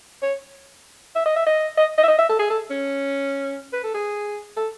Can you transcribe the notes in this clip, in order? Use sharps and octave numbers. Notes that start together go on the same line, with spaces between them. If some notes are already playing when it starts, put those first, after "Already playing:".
C#5
E5
D#5
E5
D#5
D#5
D#5
E5
D#5
E5
A4
G#4
A4
C#4
B4
A4
G#4
A4